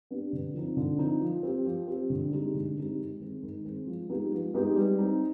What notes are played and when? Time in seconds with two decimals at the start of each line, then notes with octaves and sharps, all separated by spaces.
0.11 B3 D4 G4
0.33 D3
0.54 F3 C4 D#4
0.77 D3
0.99 F3 C4 D#4
1.21 F3
1.43 C4 G4
1.65 F3
1.88 C4 G4
2.10 D3
2.32 G#3 C4 D#4 G4
2.54 D3
2.77 G#3 C4 D#4 G4
2.99 D#3
3.20 G#3 C4
3.43 D#3
3.65 G#3 C4
3.87 F3
4.09 G#3 B3 D#4 G4
4.32 F3
4.54 G#3 B3 D#4 G4
4.76 G3
4.98 C4 D#4